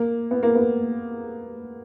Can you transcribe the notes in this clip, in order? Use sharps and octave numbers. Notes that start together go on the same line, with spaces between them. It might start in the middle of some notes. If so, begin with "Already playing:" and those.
Already playing: A#3
B3
A#3
B3